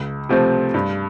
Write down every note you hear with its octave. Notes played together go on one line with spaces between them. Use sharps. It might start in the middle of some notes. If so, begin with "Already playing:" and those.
Already playing: C#2
C3 F3 A3 C4
G2